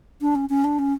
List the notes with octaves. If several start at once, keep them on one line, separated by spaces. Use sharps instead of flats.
D4
C#4
C#4
D4
C#4